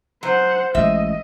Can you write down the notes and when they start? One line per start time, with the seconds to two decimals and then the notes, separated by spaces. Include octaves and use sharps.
0.23 F#3 C5 F#5
0.75 A1 G#3 D#5 E5